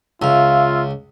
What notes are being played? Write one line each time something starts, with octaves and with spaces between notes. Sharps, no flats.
C#2 F4 E5 F5 E6